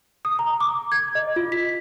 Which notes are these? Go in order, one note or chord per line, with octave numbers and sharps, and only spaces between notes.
D#6
A#5
D6
G#6
D#5
F4
B6